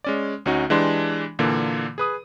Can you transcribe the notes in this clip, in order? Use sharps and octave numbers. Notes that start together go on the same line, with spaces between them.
G#3 C#4 D5
D2 C#4 D#4 F#4
E3 G#3 D4 G4 C6
A#2 D3 E3 A#3
G#4 B4 D#6